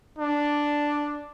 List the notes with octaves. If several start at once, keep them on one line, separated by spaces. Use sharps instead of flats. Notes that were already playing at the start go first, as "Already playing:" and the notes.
D4